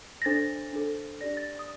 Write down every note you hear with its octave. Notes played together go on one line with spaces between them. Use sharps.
A#6
D4 A4 C5 A6
D4 A4 C5
D4 G4 D5 A#6
A6
D#6